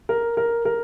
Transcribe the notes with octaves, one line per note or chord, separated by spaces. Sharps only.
A#4
A#4
A#4